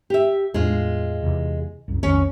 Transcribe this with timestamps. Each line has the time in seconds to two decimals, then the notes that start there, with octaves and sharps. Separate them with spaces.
0.10 G4 E5
0.54 E2 A2 G#3 D4 F4
1.23 E2 C3
1.88 C2 F#2
2.03 B1 F2 D#3 C#4